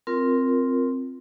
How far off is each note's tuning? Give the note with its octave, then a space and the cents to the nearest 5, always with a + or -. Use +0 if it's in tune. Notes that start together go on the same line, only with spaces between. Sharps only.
C4 +0 F4 +0 A#4 +0